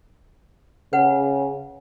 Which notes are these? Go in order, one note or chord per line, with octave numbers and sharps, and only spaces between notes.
C#3 B4 F#5